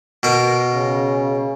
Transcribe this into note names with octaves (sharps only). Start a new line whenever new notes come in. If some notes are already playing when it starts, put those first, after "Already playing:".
B2 A#4
C#3